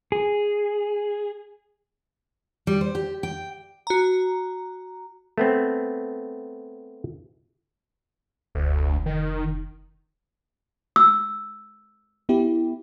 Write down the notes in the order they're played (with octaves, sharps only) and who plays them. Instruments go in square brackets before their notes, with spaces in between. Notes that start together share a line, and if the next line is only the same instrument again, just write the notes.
[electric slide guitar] G#4
[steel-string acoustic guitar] G3
C5
G4
G5
[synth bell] F#4 A#5
[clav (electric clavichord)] A3 B3 C4
[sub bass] F1 [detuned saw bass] D2
[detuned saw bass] D#3
[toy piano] E6
[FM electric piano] B3 E4 G4